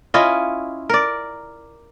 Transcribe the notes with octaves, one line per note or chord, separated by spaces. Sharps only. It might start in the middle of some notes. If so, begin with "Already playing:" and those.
C#4 E4 F4 D#5
A#4 D5